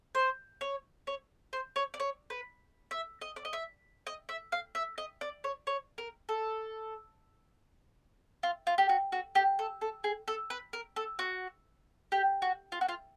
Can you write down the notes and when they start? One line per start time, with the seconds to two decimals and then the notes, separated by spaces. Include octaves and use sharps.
0.15 C5
0.61 C#5
1.07 C#5
1.53 C5
1.76 C#5
1.94 D5
2.00 C#5
2.30 B4
2.91 E5
3.21 D#5
3.36 D5
3.45 D#5
3.53 E5
4.07 D#5
4.29 E5
4.52 F5
4.75 E5
4.98 D#5
5.21 D5
5.44 C#5
5.67 C#5
5.98 A#4
6.29 A4
8.43 F4
8.67 F4
8.78 G4
8.89 F#4
9.12 F#4
9.35 G4
9.59 A4
9.81 A4
10.04 G#4
10.28 A4
10.50 B4
10.73 A#4
10.96 A4
11.19 F#4
12.12 G4
12.42 F#4
12.72 F4
12.81 F#4
12.89 F4